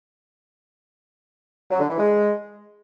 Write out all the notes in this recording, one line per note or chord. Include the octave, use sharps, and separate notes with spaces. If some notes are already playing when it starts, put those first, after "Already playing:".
F#3
D3
E3
G#3